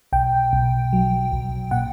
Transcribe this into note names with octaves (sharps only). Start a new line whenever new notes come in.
B1 G5
B1
F#3
B1
A#2 F#5